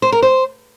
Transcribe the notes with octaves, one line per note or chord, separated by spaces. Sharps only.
C5
A#4
C5